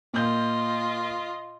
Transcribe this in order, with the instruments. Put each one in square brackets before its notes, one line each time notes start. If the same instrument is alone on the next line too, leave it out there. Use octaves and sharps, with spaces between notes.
[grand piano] A#2 G6 [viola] F4 D#5